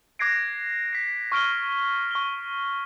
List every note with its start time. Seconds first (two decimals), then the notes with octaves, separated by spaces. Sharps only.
0.19 D6 F#6 G#6 A#6 C7 D7
0.93 B6 C7
1.32 C#6 F6 D7 G7
2.11 C#6 G7